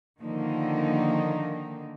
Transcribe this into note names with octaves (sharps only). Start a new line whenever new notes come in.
D3 D#3 F3 A#3 D#4